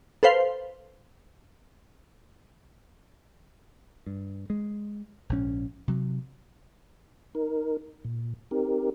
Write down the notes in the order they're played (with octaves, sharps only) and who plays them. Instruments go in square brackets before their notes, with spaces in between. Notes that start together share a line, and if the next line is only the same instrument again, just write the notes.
[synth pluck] A4 B4 C5 F5
[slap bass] G2
G#3
A#1 G#2 C#4
C3 F#3
[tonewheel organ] D#4 A#4
A#2
C4 D#4 G4 A#4